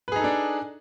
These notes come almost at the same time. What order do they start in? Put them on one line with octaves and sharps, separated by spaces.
B4 G#4 D#4 A4 D4